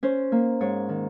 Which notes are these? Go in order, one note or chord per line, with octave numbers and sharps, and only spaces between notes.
C#4 C5
A#3
G#2 C#5
D#3